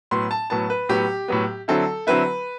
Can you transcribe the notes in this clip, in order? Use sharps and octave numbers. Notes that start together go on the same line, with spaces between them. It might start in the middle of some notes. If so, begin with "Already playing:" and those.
A2 F#3 B3 C6
A5
A2 F#3 B3 A5
B4
A2 F#3 B3 G4
A2 F#3 B3
D3 F#3 C4 E4 A4
D3 F#3 C4 E4 B4